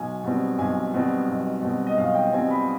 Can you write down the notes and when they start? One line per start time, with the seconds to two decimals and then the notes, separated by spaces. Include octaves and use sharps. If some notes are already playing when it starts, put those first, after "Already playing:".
Already playing: B1 G#5
0.24 B2 G3 C4
0.58 B1 G#5
0.94 B2 G3 C4
1.28 B1
1.62 B2 G3 C4
1.87 D#5
1.98 B1 F5
2.15 G5
2.33 B2 G3 C4 G#5
2.51 B5